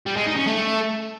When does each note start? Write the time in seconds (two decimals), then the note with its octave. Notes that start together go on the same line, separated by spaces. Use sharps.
0.06 G3
0.17 G#3
0.27 D#4
0.37 C#4
0.47 A3